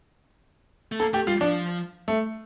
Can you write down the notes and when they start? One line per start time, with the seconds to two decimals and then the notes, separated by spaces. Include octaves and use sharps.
0.92 A3
1.00 A#3 A4
1.13 A3 G4
1.27 G3 F4
1.41 F3 D4
2.08 A3